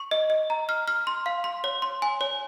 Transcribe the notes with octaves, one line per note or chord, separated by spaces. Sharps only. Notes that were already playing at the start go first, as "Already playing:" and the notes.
Already playing: C#6
D#5
D#5
A#5
F6
F6
C6
F5
C6
C#5
C6
G#5
C#5